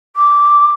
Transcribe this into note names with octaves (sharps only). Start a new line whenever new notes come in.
D6